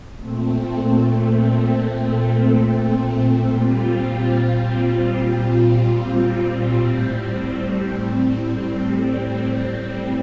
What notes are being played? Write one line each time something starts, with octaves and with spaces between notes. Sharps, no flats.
A#2 A3 C4
A#2 G3 C4 F4
A2 G3 C4